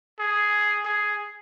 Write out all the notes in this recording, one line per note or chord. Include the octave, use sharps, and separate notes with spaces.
G#4
G#4